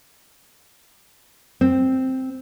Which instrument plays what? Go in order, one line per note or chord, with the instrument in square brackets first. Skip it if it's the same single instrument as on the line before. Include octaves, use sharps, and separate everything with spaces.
[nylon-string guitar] C4